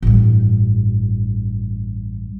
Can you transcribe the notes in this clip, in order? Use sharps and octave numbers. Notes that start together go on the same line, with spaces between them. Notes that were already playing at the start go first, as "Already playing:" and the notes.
A1 G2